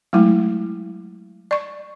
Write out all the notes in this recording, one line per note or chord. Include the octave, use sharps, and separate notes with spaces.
F#3 G#3 A3 E4
D5 C#6